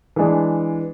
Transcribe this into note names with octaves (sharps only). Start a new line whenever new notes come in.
E3 G#3 D4 G#4